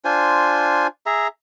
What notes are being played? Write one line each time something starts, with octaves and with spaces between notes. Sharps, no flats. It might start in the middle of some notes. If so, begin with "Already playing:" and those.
D4 F4 C5 G#5
G#4 E5 A#5